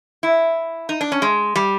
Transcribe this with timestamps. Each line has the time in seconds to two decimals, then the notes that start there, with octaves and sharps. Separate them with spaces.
0.23 E4
0.89 D#4
1.01 D4
1.12 C#4
1.22 G#3
1.56 G3